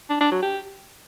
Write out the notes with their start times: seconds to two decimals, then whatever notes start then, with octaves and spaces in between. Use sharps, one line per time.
0.10 D4
0.21 D4
0.31 F#3
0.42 G4